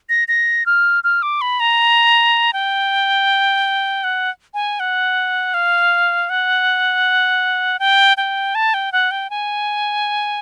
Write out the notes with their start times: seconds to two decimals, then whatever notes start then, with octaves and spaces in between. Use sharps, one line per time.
0.09 A#6
0.28 A#6
0.66 F6
1.04 F6
1.22 D6
1.41 B5
1.60 A#5
2.53 G5
4.04 F#5
4.54 G#5
4.80 F#5
5.54 F5
6.30 F#5
7.79 G5
8.17 G5
8.55 A5
8.74 G5
8.92 F#5
9.11 G5
9.30 G#5